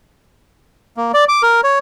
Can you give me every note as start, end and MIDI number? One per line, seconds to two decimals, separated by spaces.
0.97 1.12 58
1.14 1.24 74
1.29 1.42 86
1.43 1.61 70
1.64 1.79 73